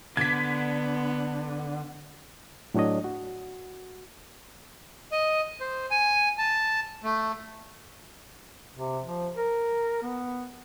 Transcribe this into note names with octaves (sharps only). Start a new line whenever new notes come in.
D3 B3 G#6 B6
A2 F#3 D4 C#5 D#5
F#4
D#5
C5
G#5
A5
A3
C3
F3
A#4
B3